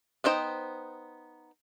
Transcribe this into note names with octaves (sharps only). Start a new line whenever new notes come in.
B3 D4 D#4 C5 G5